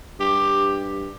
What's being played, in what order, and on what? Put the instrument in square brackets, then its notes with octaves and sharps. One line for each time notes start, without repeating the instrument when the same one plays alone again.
[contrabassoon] G2 [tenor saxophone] G4